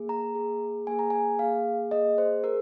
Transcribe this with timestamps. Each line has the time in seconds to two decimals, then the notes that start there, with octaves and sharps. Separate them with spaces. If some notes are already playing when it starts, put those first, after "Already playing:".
Already playing: A#3 G#4
0.09 A#5
0.35 A#3 G#4
0.87 A#3 G#4 G#5
0.99 A#5
1.10 G#5
1.39 A#3 G#4 F5
1.91 A#3 G#4 D#5
2.18 C5
2.44 G#4 A#4